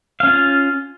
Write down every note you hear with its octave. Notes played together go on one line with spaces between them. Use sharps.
C#4 F4 F5